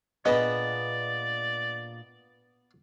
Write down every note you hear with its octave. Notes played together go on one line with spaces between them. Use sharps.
A#2 B3 D4 G#4 D5 D#5 A5 B5